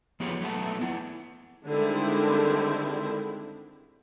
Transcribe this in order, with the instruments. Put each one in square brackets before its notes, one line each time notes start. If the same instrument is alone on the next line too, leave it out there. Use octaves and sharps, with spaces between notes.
[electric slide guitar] F3 B3 G4 G#4 C#5
F#3 A3 B3 A5
B3 E4
[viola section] D3 D#3 G3 G#3 C4 E4